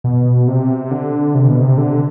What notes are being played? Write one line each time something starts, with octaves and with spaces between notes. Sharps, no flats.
B2
C3
D3
C3
B2
C3
D3